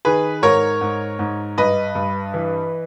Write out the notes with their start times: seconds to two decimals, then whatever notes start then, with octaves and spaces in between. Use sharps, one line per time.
0.05 D#3 G#4 B4
0.42 G#2 A#4 C#5
0.81 G#2
1.19 G#2
1.58 G2 B4 D#5
1.95 G2
2.34 E3